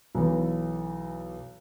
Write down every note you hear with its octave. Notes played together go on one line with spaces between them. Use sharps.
B1 E3